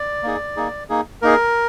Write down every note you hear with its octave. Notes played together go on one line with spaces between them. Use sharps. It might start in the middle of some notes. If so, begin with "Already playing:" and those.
Already playing: D5
A#3 D#4 G#4
A#3 D#4 G#4
A#3 D#4 G#4
A#3 D#4 G#4 A#4